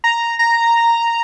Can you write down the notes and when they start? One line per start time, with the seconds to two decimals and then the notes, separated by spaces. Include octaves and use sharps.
0.04 A#5
0.39 A#5